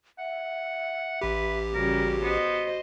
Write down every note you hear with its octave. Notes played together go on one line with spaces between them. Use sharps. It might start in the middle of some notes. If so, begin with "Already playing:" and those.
E5 F#5
A1 G4 B4
C#3 G3 F#4 A#4
B3 C5 D#5